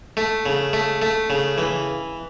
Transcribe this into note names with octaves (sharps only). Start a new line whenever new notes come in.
A3
C#3
A3
A3
C#3
E3